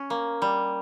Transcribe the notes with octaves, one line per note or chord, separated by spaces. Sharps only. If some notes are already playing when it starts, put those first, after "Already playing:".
Already playing: C#4
A#3
G3